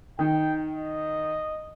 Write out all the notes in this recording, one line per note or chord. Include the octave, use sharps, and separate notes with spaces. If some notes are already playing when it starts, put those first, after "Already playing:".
D#3 D#4 G5
D#5